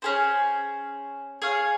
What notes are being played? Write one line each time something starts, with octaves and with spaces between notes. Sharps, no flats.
C#4 G#4 C5
G#4 C#5 F5 G#5